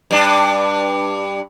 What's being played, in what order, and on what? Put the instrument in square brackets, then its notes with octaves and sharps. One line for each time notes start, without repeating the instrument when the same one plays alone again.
[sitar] G2 D4